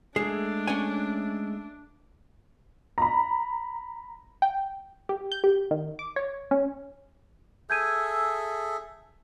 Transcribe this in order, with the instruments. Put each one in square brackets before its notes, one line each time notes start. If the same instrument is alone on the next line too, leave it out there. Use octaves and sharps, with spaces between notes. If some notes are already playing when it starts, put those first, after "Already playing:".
[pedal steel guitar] G#3 A3 [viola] D4 [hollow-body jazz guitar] G#4
[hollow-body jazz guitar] C#4 C#5 G#5
[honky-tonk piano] A#5 B5
[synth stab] G5
G4
G6
G4
D#3
D6
C#5
C#4
[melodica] G#4 A4 E5 [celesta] G6 G#6 D#7